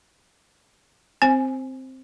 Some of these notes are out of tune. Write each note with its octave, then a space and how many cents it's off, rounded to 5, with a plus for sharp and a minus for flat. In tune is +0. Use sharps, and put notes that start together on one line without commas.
C4 +0 C5 +15 G#5 +0